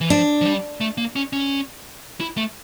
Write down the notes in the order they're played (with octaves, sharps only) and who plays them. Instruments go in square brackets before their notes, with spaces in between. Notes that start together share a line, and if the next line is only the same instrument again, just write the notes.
[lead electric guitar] E3
[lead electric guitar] F3 [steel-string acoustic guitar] D4
[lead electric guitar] F3
G3
A3
A#3
C#4
C#4
E4
A3